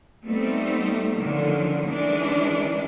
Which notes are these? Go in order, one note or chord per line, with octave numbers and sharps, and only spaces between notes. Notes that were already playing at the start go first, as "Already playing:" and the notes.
G3 A3 B3 C4 D#4
D3 D#3 F3 F#3 C#4
D#3 E3 G#3 C#4 D4